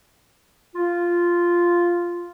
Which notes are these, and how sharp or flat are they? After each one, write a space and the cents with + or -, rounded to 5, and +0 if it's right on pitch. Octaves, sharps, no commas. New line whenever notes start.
F4 -5